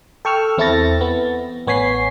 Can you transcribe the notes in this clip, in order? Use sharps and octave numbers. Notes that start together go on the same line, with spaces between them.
A4 G5 C#6 E6 F6
E2 C4 E4 A4 A6 A#6
B3
A1 B3 C#5 G#5 B6 C7